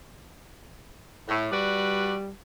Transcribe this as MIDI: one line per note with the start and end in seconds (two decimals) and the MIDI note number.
1.28 1.46 45
1.51 2.30 55
1.51 2.14 66
1.51 2.14 71
1.51 2.14 74